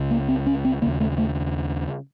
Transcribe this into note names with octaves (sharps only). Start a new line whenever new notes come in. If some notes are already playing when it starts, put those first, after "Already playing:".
Already playing: C#2 C#3
A#3
C4
C#4
C4
D#2 C#3 A#3
A3
A3